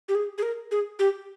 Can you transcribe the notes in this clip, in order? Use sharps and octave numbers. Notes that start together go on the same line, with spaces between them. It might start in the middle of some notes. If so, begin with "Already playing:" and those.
G4
G#4
G#4
A#4
G#4
G4